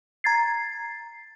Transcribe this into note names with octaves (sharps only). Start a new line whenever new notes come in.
A#5 G#6 A6 C7